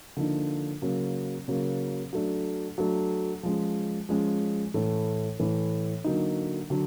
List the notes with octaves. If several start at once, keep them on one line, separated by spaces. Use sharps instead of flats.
D3 F3 A#3 D#4
C#3 F#3 A#3
C#3 F#3 A#3
F#3 A3 D4
F#3 A3 D4
F3 G#3 C#4
F3 G#3 C#4
A2 E3 A3
A2 E3 A3
D3 F#3 A#3 D#4
D3 F#3